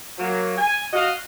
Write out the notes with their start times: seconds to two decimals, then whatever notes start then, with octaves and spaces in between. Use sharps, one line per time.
0.19 F#3 A#3
0.58 G#5
0.93 F#4 D#5 F5